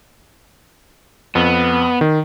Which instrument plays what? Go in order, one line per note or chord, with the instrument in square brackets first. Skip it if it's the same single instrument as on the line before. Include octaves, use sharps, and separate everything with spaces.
[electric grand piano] F2 [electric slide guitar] B3
[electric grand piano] D#3